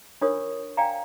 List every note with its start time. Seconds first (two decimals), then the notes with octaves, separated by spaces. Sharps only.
0.21 D4 F4 A#4 C#5 C#6 D#6
0.77 D5 F5 G5 G#5 A#5